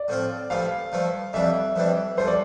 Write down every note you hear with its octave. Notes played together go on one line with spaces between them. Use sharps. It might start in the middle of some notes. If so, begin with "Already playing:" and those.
Already playing: D5
A2 F3 C4 F4
G2 F3 A3 E4 F5
G2 F3 A3 E4
F2 E3 G3 D4 E5
F2 E3 G3 D4
G2 F3 A3 C5
D5